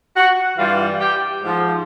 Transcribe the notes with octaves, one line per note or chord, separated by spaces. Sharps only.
F#4 F#5
G2 E3 G3 F4 F5
G4 G5
G#2 F3